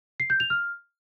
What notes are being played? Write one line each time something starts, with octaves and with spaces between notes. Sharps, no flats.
C7
G6
F7
F6